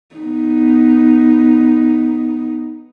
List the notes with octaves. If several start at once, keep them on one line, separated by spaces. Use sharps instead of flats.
B3 D#4